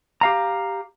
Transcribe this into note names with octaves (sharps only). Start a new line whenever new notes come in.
G4 F5 A#5